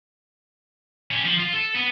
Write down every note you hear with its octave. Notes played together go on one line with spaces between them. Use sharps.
C#4 G4
F3
F4
A4
B3